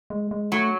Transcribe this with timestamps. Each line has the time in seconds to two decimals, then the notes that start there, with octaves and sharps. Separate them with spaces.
0.10 G#3
0.31 G#3
0.51 F#3 A3